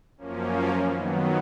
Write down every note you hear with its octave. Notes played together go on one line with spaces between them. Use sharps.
F#2 F3 A#3 C#4
D#3 F#3 B3